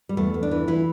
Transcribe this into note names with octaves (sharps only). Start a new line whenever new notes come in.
G3
E2 A3
E2
D4
E3
E3 E4